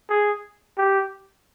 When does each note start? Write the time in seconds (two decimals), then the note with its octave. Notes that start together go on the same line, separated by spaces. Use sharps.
0.10 G#4
0.78 G4